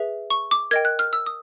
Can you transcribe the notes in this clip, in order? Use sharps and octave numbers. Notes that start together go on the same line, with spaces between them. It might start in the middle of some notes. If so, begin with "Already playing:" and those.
Already playing: G#4 B4 E5
C#6
D6
A#4 D#5 G5 G#6
F#6
F6
E6
D#6